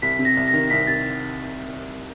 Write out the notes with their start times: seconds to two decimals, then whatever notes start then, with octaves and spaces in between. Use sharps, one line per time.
0.02 C2 B6
0.19 C3
0.25 A#6
0.37 C2
0.48 A#6
0.53 D#3
0.70 C2 B6
0.87 C3 A6